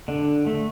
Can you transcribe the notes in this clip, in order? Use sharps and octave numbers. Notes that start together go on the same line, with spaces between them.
D3 D4
A3